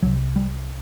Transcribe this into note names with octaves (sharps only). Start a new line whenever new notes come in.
C2 C3 F#3
G3